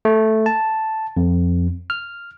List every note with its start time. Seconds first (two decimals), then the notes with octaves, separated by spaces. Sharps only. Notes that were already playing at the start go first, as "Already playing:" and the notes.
0.05 A3
0.46 A5
1.17 F2
1.90 F6